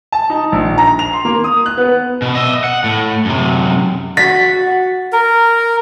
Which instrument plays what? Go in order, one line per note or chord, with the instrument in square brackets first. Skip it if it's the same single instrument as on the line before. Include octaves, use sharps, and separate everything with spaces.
[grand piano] A5
D#4
A#1
A#5
F7
C6
A#3
D#6
F#6
B3
[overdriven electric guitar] B2
D#5 E5
F#5
A2
F#2 C3
[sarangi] F#4 [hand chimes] A6 [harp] B6
[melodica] A#4